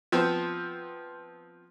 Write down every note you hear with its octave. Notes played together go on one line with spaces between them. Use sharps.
F3 B3 C4